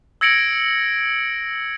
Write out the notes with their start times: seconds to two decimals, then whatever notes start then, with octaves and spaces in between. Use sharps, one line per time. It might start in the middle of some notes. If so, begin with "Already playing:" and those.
0.21 E6 G#6 A#6 C#7 D7 F#7